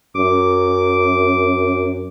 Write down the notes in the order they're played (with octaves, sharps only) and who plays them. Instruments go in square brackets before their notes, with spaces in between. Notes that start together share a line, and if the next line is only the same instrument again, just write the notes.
[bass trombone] F#2 [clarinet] D6